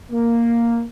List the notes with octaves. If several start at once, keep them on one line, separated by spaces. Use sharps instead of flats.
A#3